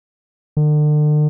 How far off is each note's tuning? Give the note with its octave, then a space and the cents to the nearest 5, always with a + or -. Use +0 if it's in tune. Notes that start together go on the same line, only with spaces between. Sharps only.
D3 +40